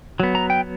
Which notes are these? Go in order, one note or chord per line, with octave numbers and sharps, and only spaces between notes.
F#3 B3
A#5
G5